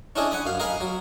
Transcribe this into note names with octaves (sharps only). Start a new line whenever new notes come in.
C#4 D4 E4 G#4 D#5
F#5 G#5 B5 D#6
F#2 F5
A#4 D#5 F5 G#5 B5
F#3